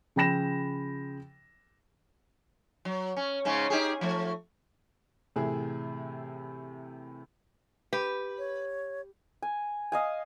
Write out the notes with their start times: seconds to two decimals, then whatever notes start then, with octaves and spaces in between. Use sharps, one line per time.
0.16 C#3 F3 G5 B5 A#6 E7
2.85 F#3
3.17 C#4
3.45 G#2 C#3 C#4
3.70 D#4 G4 G#4
4.01 F3 A3
5.36 A2 C3 E3 E4 G#4
7.93 G4 B4
8.38 C#5
9.42 G#5
9.92 D#5 F5 G#5